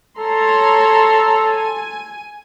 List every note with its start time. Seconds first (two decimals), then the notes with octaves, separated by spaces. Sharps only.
0.19 A4 C#5 A#5 C6
1.49 G#5